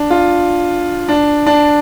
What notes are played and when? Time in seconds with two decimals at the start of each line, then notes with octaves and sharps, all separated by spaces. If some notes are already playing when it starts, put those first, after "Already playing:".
Already playing: D4
0.10 F4
1.09 D4
1.46 D4